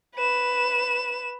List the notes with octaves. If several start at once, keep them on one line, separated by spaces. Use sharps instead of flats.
B4 E7